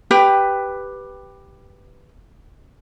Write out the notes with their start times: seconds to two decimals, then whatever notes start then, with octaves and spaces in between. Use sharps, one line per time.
0.11 G4 B4 G5